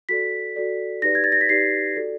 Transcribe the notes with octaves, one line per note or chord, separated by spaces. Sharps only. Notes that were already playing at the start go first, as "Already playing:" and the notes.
F#4 A4 D5 B6
F#4 A4 D5
D#4 G4 B4 D5 A#6
G#6
A6
A#6
B6
D#4 G4 B4 D5 C7
F#4 A4 D5